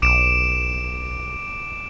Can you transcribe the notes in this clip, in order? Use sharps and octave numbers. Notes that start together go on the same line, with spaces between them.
B1 D6 D7 E7